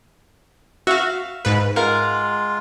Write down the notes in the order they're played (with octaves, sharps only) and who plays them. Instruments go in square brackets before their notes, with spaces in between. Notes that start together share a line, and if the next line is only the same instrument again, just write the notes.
[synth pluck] F#4 [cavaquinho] E5 F5
[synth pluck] G#2 B4
[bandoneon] G#3 F4 [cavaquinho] A#4 F5 F#5